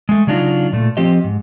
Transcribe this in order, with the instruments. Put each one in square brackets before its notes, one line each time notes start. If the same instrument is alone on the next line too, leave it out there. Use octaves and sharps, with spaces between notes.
[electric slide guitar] G#3 A3
C#3 F#3 D4 D#4 F4
A#2 A3
F3 C4 G4 D#5
G#2